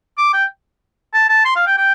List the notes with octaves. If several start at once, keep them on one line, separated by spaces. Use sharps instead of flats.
D6
G5
A5
A5
C6
F5
G5
G5